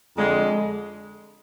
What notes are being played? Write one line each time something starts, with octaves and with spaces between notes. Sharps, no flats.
F2 D3 G#3